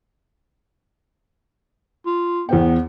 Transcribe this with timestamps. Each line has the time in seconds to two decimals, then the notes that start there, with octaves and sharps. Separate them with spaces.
2.06 F4
2.49 E2 B3 C5 G5